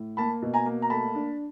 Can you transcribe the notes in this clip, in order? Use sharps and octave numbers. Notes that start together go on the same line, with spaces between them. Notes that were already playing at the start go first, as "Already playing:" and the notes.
Already playing: A2
A#3 A5 B5
B2
G#5 A#5
A#3
A#5
A3 A5 B5
D4